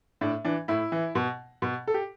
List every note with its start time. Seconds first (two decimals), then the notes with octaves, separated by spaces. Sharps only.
0.21 A2 D4
0.44 E3 D4
0.68 A2 E4
0.92 E3
1.15 B2
1.62 B2
1.87 A4
1.94 G4